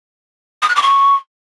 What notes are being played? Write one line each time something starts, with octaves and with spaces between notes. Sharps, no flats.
D#6
F#6
D6
C#6